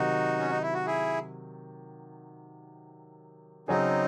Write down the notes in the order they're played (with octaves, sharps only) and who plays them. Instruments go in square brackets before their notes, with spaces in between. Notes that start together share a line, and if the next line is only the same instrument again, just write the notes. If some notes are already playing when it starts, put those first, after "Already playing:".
Already playing: [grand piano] C3 D#3 F#3 [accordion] D#4 F#4
[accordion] C#4
D#4
E4
F#4
E4 G#4
[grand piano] C#3 F#3 C#4 G#4 [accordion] C4 D#4